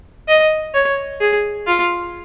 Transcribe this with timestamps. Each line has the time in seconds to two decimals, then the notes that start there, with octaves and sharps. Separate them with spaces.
0.28 D#5
0.74 C#5
1.21 G#4
1.67 F4